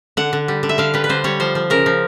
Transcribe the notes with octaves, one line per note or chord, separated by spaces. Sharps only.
D3 F#5
D3
G3
D3
E5
D3 F5
G3 B4
B4
D3 C5
G3 C#5
F3 C5
F3
C#3 A#4
F3